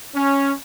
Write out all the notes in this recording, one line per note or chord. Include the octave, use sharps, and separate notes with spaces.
C#4